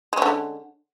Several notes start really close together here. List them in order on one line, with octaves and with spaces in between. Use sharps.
G#3 C#4 D3